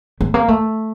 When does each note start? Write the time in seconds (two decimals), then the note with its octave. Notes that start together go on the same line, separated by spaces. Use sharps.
0.21 A3
0.34 A#3
0.48 A3